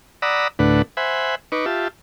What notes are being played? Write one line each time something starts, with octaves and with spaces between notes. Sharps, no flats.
D5 F#5 A#5 B5 D#6 E6
D2 A2 D4 B4 F#5
C5 E5 F#5 G#5 B5
D#4 B4 C#6 D6
F4 G4 E5 A5